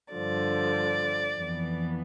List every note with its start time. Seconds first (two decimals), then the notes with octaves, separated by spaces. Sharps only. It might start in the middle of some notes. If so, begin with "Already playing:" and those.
0.13 G2 D3 F3 D5
1.35 F2 E3 B3